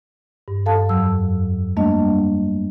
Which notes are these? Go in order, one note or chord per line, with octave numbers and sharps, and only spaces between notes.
G2
A4 F5 A5
F2 F#3 E6
G3 A3 A#3 D4 D#5